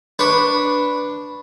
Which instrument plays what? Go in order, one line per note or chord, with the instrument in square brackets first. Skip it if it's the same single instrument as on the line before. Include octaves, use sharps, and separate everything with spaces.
[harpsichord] D4 B4 C#6